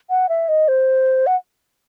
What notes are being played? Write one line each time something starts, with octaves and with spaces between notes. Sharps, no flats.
F#5
E5
D#5
C5
F#5